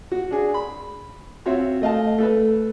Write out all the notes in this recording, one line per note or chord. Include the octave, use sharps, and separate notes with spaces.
F#4
D4 G#4
B5
C4 F4 F#4 C#5 E5
A3 D#5 F5 A5
A3 A4 B4